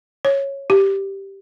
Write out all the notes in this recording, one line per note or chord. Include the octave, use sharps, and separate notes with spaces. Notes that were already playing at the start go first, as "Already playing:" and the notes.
C#5
G4